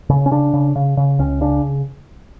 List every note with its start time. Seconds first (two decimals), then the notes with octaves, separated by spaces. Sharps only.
0.10 C#3
0.26 C#4
0.31 C#3 D4
0.54 C#3
0.76 C#3
0.97 C#3
1.19 C#2 C#4
1.41 C#3 D4